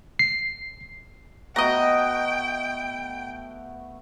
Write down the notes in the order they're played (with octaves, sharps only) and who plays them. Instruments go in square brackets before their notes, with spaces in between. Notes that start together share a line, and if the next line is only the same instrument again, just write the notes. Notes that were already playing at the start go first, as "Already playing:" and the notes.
[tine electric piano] C7
[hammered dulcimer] A3 B3 F#4 [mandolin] D#5 A#5 [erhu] G5